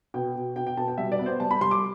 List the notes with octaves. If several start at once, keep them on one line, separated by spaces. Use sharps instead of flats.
B2 G5
B2
B2 G5
G5
B2 A5
G5
G3 E5
D5
B3
C5
G3 A5
B5
G3 C6
D6